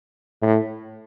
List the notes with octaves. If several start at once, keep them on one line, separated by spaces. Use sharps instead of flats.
A2